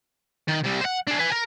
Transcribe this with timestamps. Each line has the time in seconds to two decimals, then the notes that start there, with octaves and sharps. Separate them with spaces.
0.48 D#3
0.64 C3 G3
0.81 C5 F#5
1.08 D4 G#4
1.19 B4 G#5
1.32 A#4